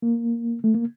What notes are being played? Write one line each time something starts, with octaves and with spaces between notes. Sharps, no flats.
A#3
A3
A#3